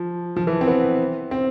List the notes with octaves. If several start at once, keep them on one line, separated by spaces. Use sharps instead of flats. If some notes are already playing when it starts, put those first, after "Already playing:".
Already playing: F3
F3
E3
C4
B3
C4